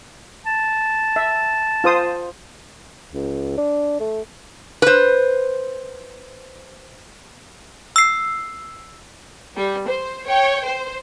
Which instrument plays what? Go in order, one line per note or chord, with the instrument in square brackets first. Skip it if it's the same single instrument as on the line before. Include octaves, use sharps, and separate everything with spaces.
[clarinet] A5
[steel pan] E5
F4 C5 D#6
[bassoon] C#2
D4
A3
[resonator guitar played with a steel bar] B4 C5
[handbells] E6 C7
[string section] G3
C5
C#5 G5
C5